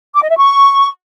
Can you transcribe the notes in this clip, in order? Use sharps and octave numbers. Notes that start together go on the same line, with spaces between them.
D6
D#5
E5
C#6